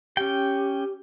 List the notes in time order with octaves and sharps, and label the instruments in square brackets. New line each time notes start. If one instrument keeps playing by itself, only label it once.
[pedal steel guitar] C#4 G5 [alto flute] G4